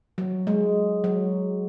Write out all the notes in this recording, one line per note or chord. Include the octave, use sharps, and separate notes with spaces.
F#3
G#3
F#3